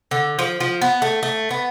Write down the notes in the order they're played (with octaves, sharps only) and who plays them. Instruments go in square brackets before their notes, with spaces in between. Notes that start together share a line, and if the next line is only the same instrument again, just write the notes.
[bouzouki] D3
F3
F3
B3
A3
A3
B3